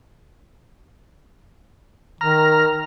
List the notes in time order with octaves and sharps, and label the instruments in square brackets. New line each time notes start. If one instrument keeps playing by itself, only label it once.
[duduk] D#3 [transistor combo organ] A#5 F6